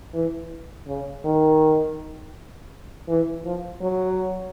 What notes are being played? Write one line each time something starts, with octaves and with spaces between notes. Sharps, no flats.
E3
C#3
D#3
E3
F3
F#3